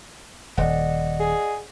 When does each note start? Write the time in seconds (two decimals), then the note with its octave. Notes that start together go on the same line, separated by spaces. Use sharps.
0.57 D#1 D5 D#5 F#5
1.20 G#4